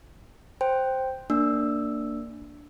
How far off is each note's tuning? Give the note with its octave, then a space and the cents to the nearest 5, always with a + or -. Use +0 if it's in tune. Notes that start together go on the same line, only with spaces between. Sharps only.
C5 +0 G5 +0
A#3 -15 D4 +0 E6 +0